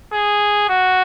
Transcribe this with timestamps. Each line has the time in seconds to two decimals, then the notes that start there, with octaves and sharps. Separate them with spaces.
0.13 G#4
0.69 F#4